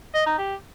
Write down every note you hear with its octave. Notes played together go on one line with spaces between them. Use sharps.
D#5
D#4
G4